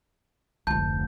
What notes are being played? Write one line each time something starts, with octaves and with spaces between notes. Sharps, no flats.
F1 D2 A5 G6